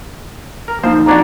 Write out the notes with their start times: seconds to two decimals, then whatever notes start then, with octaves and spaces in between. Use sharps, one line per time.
0.68 A#4
0.83 F3 A#3 D#4 A#4 C5
1.06 F2 D4 F#4 A#5 D6 G#6